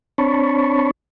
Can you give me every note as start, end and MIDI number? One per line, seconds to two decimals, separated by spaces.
0.18 0.91 60
0.18 0.91 62
0.18 0.91 73
0.18 0.91 81
0.18 0.91 83
0.18 0.91 85